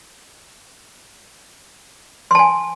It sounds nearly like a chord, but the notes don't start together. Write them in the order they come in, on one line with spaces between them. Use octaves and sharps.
C6 A5 G#5